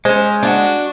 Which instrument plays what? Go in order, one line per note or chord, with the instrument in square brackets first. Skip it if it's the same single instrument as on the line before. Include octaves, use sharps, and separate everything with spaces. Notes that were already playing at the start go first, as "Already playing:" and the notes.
[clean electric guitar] G#3 [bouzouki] C#4 C5
[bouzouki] D4 F4 F#4